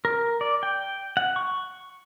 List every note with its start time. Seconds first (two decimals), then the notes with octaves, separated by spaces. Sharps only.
0.05 A#4
0.41 D5
0.63 G5
1.17 F#5
1.36 C#6